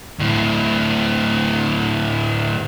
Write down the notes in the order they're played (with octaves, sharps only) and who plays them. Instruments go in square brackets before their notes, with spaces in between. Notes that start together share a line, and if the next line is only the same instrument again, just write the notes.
[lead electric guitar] D2 A2